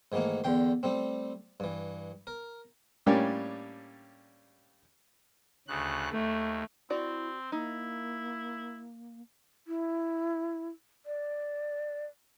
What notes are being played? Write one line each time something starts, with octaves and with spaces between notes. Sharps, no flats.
G#2 D#3 E3 A3 A#3
E2 D3 G5 C6
G3 A3 C4
G2 E3
A#4
A2 G3 A#3 C#4 D4 G4
D2 C#3 F#6
D#2 A3
C4 E4 F#4 D5
A#3 D#4 E4
E4
D5